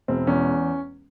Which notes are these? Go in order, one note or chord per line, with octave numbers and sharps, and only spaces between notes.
E1 C4
E2 C#4